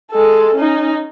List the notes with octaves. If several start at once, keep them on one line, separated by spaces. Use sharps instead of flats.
G#3 A4
C#4 D#4